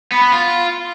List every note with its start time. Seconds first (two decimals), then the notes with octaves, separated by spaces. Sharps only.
0.12 B3
0.22 B3
0.33 F4